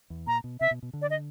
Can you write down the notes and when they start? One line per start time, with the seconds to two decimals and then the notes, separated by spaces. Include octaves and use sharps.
0.10 E2
0.27 A#2 A#5
0.44 B2
0.60 C3 E5
0.71 B2
0.82 B2
0.93 D3
1.02 D5
1.10 D#5